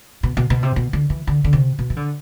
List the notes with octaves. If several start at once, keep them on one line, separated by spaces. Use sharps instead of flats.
B2
B2
B2
C3
B2
D3
E3
D3
D3
C3
B2
E3
D3